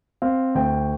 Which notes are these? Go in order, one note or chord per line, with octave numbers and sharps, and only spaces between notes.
C4 F5
D2 G5